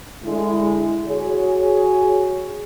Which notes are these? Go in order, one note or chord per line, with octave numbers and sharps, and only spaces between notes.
D3 G#3 E4
F#4 G#4 C#5